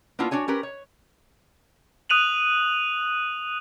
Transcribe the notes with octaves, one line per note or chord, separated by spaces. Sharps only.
A#3 B3 D4 E4 F4
D4 F#4 C#5 G#5
C#4 G4 A#4 B4
C#5
D#6 F#6 D#7 F7 F#7